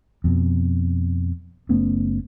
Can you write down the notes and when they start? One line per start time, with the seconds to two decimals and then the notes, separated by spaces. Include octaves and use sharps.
0.24 F2 B2
1.69 F#1 A3 B3 C#4